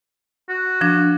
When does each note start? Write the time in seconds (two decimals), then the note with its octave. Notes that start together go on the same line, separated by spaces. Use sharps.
0.49 F#4
0.81 F3 D4